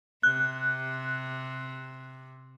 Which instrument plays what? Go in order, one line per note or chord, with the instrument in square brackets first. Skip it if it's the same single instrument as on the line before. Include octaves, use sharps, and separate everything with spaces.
[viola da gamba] C3 [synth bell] F#6